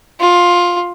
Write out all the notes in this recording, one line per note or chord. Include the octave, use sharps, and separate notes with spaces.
F4